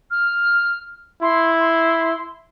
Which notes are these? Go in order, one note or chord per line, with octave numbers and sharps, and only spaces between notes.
F6
E4 C6
C6